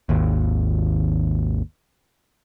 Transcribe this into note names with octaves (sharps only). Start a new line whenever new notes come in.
G#1 D#2